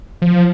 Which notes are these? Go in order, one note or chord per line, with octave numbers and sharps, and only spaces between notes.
F3